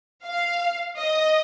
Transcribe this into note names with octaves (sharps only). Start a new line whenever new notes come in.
F5
D#5